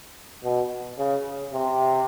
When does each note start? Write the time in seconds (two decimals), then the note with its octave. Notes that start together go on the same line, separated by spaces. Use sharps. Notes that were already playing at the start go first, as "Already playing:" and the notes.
0.44 B2
0.98 C#3
1.53 C3